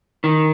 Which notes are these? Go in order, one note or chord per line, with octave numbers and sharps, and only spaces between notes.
D#3